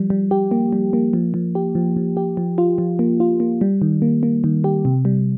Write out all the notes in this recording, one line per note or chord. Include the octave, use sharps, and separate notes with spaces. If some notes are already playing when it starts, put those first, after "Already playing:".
Already playing: F3 G3
G3
G4
A#3
G3
A#3
F3
F3
G4
F3
F3
G4
F3
F4
F3
A#3
F4
A#3
G3
D#3
A#3
A#3
D#3
G4
C3
G3